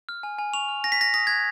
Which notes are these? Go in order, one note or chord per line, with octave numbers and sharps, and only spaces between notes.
F6
G#5
G#5
C#6 F7
F6
G#5 A#6
B6
G#5 A#6
D#6 A#6
F#6 G#6